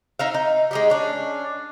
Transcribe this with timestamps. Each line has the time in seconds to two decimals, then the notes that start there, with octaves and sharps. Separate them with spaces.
0.19 D#4 E5 F5
0.34 D#4
0.71 G#3 D#4 G4
0.90 C#4 D4